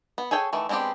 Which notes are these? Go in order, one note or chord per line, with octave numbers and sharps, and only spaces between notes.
B3
G#4 A4 C#5 G5 G#5
D#3 E3 A3
G#3 B3 C4 D4 G4